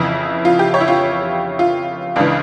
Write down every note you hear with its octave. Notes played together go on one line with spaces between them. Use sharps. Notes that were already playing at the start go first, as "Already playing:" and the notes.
Already playing: F2 C#3 E3 E4
F4
G4
C#5
E4
F4
F4
C#2 C#3 E3 D4